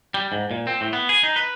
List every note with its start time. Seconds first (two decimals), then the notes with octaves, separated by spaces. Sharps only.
0.14 G3
0.32 G#2
0.51 A#2
0.67 C4
0.81 A2
0.93 B3
1.09 G#4
1.23 D#4
1.36 B4